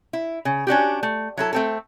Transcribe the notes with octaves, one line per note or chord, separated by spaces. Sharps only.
E4
C#3
C#4 D4 F#4 G4
A3
F#3 E4 A4
A3 C4 A4